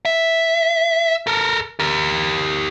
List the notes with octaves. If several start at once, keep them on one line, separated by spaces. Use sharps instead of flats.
E5
A4 A#4
G4 A#4